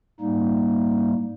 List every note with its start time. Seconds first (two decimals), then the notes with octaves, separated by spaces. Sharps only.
0.20 G#2 G3 A#3 D#4